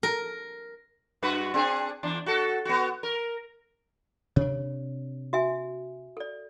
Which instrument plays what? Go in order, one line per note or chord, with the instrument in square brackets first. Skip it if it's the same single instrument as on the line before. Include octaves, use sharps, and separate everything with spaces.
[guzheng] A#4
[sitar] G2 F#4 B4
C4 D4 G#4
E2 D4
F#4 A4
B3 F#4
A#4
[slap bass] C3 D4 [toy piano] C#5
[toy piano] F#4 E5 G#5
A4 D5